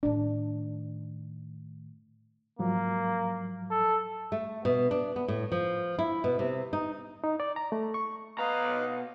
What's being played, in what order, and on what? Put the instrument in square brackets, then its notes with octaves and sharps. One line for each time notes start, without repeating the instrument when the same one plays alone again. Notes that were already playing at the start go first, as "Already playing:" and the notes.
[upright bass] A2 D#3 [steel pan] D4
[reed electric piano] G#2 F3 F#3 [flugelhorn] A#3
[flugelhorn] A4
[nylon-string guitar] A3
B2
D4
B3
A2
F3
E4
B2
C3
D#4
[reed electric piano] D#4
D5
A#5
A3
C#6
[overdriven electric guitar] B2 A#5 [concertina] B4 F5 [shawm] D#5